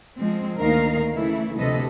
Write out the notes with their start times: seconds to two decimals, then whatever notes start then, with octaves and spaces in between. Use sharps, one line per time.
0.18 F3 G#3 C4
0.58 D2 D#3 A#3 D#4 A#4 F5
1.15 C#3 E3 A3 E4
1.58 D2 C3 F3 A4 B4 D#5